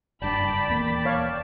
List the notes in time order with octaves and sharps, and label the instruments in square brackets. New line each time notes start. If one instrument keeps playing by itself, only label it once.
[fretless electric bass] F#1 G2 [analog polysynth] D5 G5 A5 [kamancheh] B5
[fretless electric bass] D#1 E2 A#3
[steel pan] C#5 F5